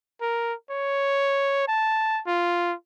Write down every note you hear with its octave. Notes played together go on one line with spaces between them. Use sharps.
A#4
C#5
A5
F4